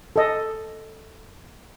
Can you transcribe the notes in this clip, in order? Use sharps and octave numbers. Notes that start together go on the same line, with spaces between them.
A4 D#5